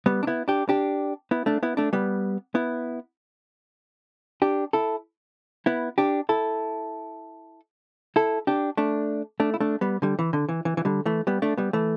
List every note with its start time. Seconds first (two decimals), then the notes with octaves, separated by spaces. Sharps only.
0.06 G3 B3
0.23 D4
0.27 B3 E4
0.48 D4 G4
0.69 D4 G4
1.31 B3 E4
1.46 A3 D4
1.63 B3 E4
1.77 A3 D4
1.93 G3 B3
2.55 B3 E4
4.42 D4 G4
4.73 E4 A4
5.66 B3 E4
5.98 D4 G4
6.29 E4 A4
8.16 E4 A4
8.47 D4 G4
8.77 A3 D4
9.40 A3 D4
9.54 E4
9.60 A3 D4
9.81 G3 B3
10.02 D3 G3
10.19 E3
10.33 D3
10.49 E3
10.65 E3
10.77 E3
10.85 D3 G3
11.06 E3 A3
11.27 G3 B3
11.42 A3 D4
11.58 G3 B3
11.73 E3 A3